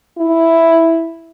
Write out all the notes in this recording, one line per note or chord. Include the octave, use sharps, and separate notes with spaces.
E4